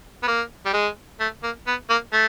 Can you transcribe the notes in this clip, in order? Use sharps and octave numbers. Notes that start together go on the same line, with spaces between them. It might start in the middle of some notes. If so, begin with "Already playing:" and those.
B3
A#3
G3
G#3
A3
A#3
B3
A#3
A3